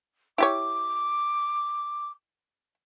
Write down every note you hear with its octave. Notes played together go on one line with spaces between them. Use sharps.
E4 G4 C#5 D6